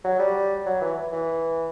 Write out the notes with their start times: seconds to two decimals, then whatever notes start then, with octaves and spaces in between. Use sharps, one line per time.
0.04 F#3
0.19 G3
0.66 F#3
0.81 E3
1.12 E3